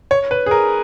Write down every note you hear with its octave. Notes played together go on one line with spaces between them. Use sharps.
C#5
B4
G#4
A#4